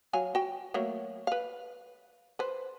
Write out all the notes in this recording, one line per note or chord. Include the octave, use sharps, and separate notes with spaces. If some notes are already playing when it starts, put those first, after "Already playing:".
F#3 F5 G#5
F#4 G5
F#3 A3 A#3
B4 F5
B4 C5